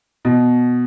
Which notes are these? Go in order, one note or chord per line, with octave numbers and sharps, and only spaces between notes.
B2 B3